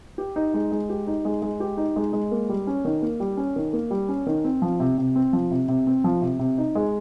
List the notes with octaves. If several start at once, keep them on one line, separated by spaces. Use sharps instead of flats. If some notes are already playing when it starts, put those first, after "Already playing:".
G4
D#4
G#3
G#3
G4
D#4
G#3
G#3
G4
D#4
G#3
G#3
A#3
G3
C#4
D#3
A#3
G3
C#4
D#3
A#3
G3
C#4
D#3
C4
F3
C3
C3
C4
F3
C3
C3
C4
F3
C3
C3
D#4
G#3